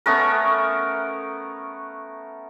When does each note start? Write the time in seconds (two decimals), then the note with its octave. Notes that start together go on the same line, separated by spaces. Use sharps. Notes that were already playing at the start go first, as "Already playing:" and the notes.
0.06 A3 B3 C#4 A#4